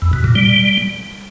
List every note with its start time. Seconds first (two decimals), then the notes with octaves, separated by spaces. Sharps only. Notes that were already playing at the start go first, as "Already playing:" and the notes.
0.02 E2
0.13 B2
0.24 A#2
0.35 G3